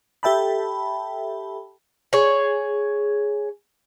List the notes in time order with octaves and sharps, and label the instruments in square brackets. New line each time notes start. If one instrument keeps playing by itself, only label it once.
[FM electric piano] G4 A4 E5 G5 A5 B5
[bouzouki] G#4 C#5